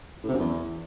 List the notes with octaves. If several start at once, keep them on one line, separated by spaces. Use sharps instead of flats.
A2
C3
F#2
E2